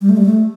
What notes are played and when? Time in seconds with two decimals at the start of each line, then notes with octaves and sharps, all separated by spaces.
0.01 G3
0.09 A3
0.17 G3
0.26 A3